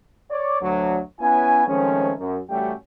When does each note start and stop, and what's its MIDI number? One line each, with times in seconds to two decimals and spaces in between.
0.31 0.60 73
0.31 0.60 74
0.61 0.99 38
0.61 0.99 54
1.20 1.64 59
1.20 1.64 61
1.20 1.64 64
1.20 1.64 71
1.20 1.64 73
1.20 1.64 80
1.68 2.12 51
1.68 2.12 53
1.68 2.12 56
1.68 2.12 57
1.68 2.12 60
1.68 2.12 61
2.19 2.38 42
2.50 2.72 33
2.50 2.72 55
2.50 2.72 57
2.50 2.72 61
2.50 2.72 66
2.50 2.72 79